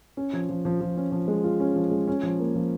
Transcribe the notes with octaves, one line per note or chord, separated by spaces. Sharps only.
C#4
F3
F3
F3
F3
C#4
F3
G#3
F4
C#4
F3
G#3
C#4
F3
A#3
F3